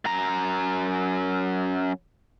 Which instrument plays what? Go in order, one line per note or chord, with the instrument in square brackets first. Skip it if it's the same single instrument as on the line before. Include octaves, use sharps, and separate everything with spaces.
[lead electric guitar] F#2 A#5